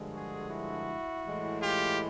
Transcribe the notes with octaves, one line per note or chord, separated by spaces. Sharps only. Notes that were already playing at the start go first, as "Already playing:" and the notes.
Already playing: G2 D3 F3 G#3
F#4 G#4
E4 F#4
A2 E3 G#3
F4 G4